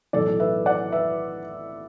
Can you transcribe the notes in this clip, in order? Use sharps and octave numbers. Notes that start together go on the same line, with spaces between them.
B1 A2 E3 A4 D5
B4 E5
D5 F#5
B4 E5